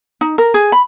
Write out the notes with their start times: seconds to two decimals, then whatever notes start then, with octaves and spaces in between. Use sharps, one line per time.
0.21 D#4
0.38 A#4
0.54 G#4
0.72 B5